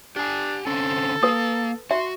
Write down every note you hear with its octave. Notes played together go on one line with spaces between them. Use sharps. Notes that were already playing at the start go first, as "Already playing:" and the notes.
D4 G4 G#5
D3 C4 C#4 A4
A#3 B4 D#6
F#4 E5 C6